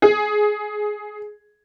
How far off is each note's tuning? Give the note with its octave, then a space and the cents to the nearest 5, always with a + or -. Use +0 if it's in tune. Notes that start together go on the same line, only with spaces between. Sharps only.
G#4 +15